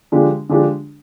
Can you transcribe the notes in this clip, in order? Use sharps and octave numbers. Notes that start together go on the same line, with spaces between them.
D3 F3 G#3 D4 G4
D3 F3 G#3 D4 G4